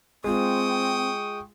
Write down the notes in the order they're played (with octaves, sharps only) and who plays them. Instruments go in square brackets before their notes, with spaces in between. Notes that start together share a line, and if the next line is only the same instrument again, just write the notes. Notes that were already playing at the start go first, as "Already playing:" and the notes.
[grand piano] G#3 F4 [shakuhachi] C4 [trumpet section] G5 C#6 D#6